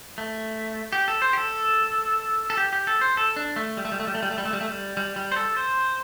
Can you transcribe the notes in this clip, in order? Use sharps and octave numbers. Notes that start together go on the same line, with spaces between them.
A3
G4
A4
C5
G4
A4
A4
G4
G4
A4
C5
A4
D4
A3
G3
A3
G3
A3
G3
A3
G3
A3
G3
A3
G3
A3
G3
G3
G3
C5
A4
C5